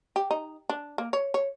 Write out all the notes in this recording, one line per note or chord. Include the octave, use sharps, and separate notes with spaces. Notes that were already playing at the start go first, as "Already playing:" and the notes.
G4
D#4
D4
A#3
C#5
C#5